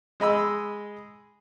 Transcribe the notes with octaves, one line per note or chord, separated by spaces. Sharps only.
G#3 D#5 B5 E6